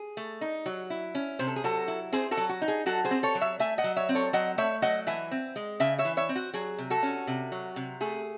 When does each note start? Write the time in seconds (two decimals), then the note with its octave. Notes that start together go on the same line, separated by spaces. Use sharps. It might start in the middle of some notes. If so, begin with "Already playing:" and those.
Already playing: G#4
0.17 A3
0.41 D#4
0.66 F#3
0.90 E4
1.15 C#4
1.39 C3 C5
1.47 A4
1.56 G#4
1.64 F#3 F#4 A4
1.88 E4
2.12 C4 G#4 C5
2.31 F#4 A4
2.37 F#3
2.49 F#4
2.62 D#4
2.68 G#4
2.86 F#3 F#4 A4
3.04 G#4 C5
3.11 C4
3.23 A4 C#5
3.35 F#3
3.41 C#5 E5
3.59 A3 E5 G#5
3.78 D#5 F#5
3.84 F#3
3.96 C#5 E5
4.09 C4
4.15 A4 C#5
4.33 F#3 D#5 F#5
4.58 A3 C#5 E5
4.82 F#3 D#5 F#5
5.07 E3 E5 G#5
5.31 C4
5.56 G#3
5.80 C#3 E5 G#5
5.98 C#5 E5
6.05 E3
6.17 C#5 E5
6.29 C4
6.36 F#4
6.54 F#3 G#4
6.78 C3
6.90 F#4 A4
7.03 C#4
7.27 C3
7.52 F#3
7.76 C3
8.01 A3 G#4